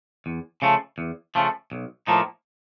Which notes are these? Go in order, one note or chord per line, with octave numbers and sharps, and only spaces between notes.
E2
C#3 F3 A3
E2
C#3 F3 A3
B1
A2 F3 A#3 D#4